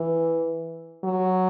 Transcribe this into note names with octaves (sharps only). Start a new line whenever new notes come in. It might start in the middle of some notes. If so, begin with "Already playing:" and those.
Already playing: E3
F#3